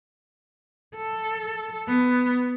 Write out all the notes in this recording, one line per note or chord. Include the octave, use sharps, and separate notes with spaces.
A4
B3